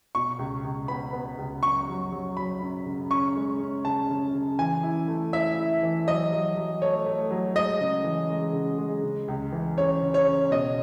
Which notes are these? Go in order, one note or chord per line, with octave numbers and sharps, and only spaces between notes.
B2 C#6
C#2
C#2
B3 B5
B3
C#2
F#2 C#6
F#3
F#3
F#3 B5
F#2
C#3
C#4 C#6
G#3
C#4
C#3 A5
C#3
C#3
E3 G#5
E4
A3
E4 E5
E4
E3
F#3 D#5
F#3
F#3
A3 C#5
A3
F#3
G#3 D#5
C#3
E3
G#3
C#3
G#3
C#3
C#2
E3
C#3 C#5
C#3
C#5
C#3
B2 D#5